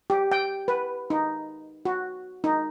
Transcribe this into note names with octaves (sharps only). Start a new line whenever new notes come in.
G4
G5
B4
D#4
F#4
D#4